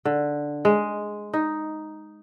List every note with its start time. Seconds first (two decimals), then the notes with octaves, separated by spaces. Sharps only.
0.05 D3
0.65 G#3
1.33 D#4